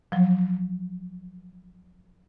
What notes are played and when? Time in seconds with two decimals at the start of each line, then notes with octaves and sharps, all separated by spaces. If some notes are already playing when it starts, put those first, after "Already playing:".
0.12 F3 F#3